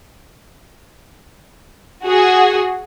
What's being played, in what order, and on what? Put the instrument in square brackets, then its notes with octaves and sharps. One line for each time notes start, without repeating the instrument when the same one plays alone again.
[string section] F#4 G#4